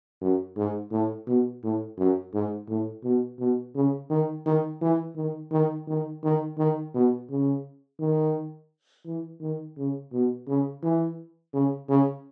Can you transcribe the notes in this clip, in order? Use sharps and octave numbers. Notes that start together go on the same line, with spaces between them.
F#2
G#2
A2
B2
A2
F#2
G#2
A2
B2
B2
C#3
D#3
D#3
E3
D#3
D#3
D#3
D#3
D#3
B2
C#3
D#3
E3
D#3
C#3
B2
C#3
E3
C#3
C#3